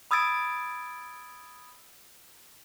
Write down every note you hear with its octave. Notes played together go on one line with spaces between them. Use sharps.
B5 D#6 E6 G#6 A6 D7